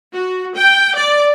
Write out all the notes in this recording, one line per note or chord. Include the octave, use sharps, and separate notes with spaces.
F#4
G5
D5